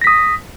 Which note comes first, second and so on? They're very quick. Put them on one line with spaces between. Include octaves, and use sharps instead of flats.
A#6 B6 D#6